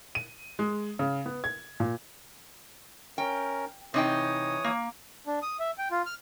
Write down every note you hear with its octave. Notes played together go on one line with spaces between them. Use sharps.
D#7
G#3
C#3
B3
G#6
A#2
C#4 A#4 G5
C3 E3 D#4 C#5 G5 D#6
A#3
D4
D#6
E5
G5
F4
F6